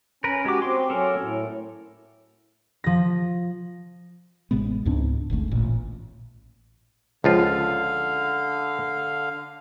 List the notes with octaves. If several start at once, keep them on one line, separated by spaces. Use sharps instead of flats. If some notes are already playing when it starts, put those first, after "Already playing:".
C#4 A#4 B4
G#3 F#4 G4 D6
C4 C6 D6
F#3 C#4 A4 A#4
A2
F3 A#6
A1 C3 G#3 B3
C#2 G#2 C4 D4
G1 D2 G#2 A3
A1 A#2
C#2 D3 F3 F4 F5